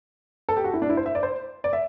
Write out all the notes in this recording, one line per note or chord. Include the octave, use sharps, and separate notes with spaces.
A4
G4
F#4
E4
D4
E4
C5
E5
D5
C5
D5
E5